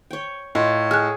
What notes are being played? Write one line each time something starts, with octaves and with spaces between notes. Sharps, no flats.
C#5 G5
A2 F4 D#5
G#4 F6 F#6